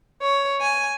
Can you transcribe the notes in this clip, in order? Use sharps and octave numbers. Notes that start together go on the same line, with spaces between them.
C#5
G#5